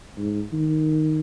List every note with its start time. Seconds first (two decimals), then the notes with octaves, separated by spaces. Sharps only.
0.18 G#2
0.53 D#3